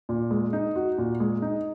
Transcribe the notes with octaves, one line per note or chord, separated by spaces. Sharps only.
A#2
G#3
D#4
F#4
A#2
G#3
D#4